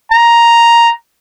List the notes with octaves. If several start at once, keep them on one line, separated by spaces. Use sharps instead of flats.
A#5